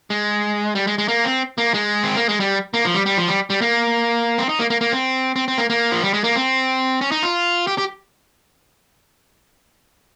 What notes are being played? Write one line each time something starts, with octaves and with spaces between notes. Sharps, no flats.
G#3
G3
G#3
G#3
A#3
C4
A#3
G#3
C4
A#3
G#3
G3
A#3
F3
G3
G3
F3
G3
G3
A#3
C4
D#4
A#3
A#3
A#3
C4
C4
C4
A#3
A#3
F3
G3
G#3
A#3
C4
C#4
D#4
F4
G4
G4